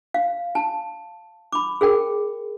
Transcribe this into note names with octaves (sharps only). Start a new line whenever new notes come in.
F5
A5
B5 D6
G#4 A#4 G5